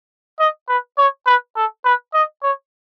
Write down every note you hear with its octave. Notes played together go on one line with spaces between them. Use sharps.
D#5
B4
C#5
B4
A4
B4
D#5
C#5